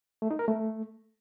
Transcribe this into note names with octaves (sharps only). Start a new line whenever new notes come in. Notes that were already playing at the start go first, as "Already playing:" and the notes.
A3
D#4
A#4
A3